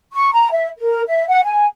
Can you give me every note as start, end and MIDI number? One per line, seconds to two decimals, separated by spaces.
0.13 0.29 85
0.32 0.48 82
0.52 0.68 76
0.78 1.02 70
1.07 1.26 76
1.27 1.39 78
1.44 1.65 80